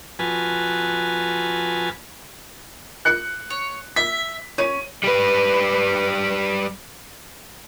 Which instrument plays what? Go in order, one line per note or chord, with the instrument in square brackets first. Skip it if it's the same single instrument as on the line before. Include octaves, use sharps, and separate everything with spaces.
[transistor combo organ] F2 F#4 B4 G#5 A5 F6
[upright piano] F#6 C#7
[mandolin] C#5
[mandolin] E5 [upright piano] B6
[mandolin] C#4 [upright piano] C#5 D#7
[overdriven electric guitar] G3 B4